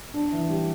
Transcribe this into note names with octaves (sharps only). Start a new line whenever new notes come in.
D4
E3
G3